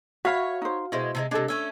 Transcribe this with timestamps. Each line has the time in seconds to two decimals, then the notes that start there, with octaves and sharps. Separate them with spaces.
0.25 F#4 C#5 E5 F5 B5
0.62 D#4 C5
0.92 B2 G#3 E4 C5
1.15 C3 E3 G#3
1.31 C3 G#3 D4 A4
1.48 A3 C#4 E5